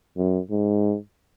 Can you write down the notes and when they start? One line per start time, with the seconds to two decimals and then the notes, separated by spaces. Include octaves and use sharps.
0.17 F#2
0.50 G#2